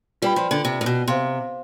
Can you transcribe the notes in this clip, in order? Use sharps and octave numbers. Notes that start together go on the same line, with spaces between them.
G3 F4 B4 D5 G5 B5
F3
D3
C3
A2
B2
C3 C5 F5 C6